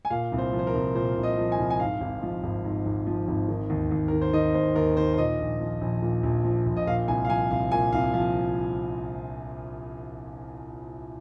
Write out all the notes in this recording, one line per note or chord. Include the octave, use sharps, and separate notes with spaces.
G#5
A#2 F5
C2
C5
F3
C5
A#4
C2
A#2 C5
C2
D#5
F3
G#5
C2
G#5
G#2 F5
G#1
F3
G#1
G#2
G#1
F3
G#1
D#3
D#2
D#2
D#3 A#4
C5
D#3 D#5
D#2 C5
D#2 A#4
D#3 C5
C5
A#2 D#5
A#1
F3
A#1
A#2
A#1
F3
A#1
D#5
A#2 F5
C2 G#5
F5
F3 G#5
C2 F5
A#2 G#5
C2 F5
F3 F5